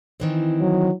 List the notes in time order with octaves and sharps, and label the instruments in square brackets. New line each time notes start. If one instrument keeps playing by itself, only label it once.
[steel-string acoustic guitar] D#3 E3 C4
[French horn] F#3